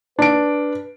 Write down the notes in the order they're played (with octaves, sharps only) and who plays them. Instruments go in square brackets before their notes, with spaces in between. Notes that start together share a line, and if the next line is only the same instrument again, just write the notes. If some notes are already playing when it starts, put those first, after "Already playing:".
[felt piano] D4 D7 [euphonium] B4